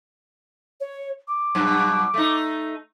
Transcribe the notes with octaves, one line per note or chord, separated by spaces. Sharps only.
C#5
D6
G2 B2 F#3
A3 D#4